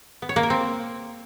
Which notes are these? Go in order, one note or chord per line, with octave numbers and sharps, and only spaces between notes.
B3
C#5
A#3
A#4
C4